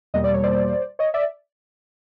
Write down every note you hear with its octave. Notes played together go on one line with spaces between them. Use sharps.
E2 B2 G3 A#3 D#5
D5
C#5
C5 D5
C#5 D#5
D5 E5